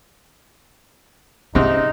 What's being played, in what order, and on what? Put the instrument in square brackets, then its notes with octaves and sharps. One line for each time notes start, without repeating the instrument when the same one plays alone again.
[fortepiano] G#2 C3 [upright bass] C#4 [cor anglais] D#4